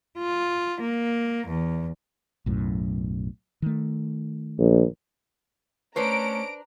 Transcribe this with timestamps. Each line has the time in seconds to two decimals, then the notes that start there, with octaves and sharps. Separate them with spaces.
0.18 F4
0.81 A#3
1.48 E2
2.46 B1 F#2 A2
3.62 D#3 A3
4.59 A#1
5.96 A3 C#4 D4 B4 C5 A#5 D7